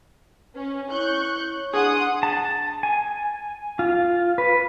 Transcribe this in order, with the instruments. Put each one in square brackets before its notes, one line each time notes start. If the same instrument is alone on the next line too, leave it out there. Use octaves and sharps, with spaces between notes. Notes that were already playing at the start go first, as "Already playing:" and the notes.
[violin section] C#4
[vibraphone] E4 C#5 [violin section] C#6 F#6 G6
[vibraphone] D4 [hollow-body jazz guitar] G#4 [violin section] F#5 C6 D#6
[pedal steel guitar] A5
G#5
F4
B4